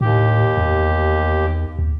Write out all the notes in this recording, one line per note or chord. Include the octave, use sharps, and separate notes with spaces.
D#2 A2 G4
E2
D#2